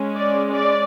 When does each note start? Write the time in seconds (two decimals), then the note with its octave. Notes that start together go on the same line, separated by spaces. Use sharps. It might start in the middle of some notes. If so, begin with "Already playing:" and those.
Already playing: G#3 C#4
0.16 D5
0.51 D5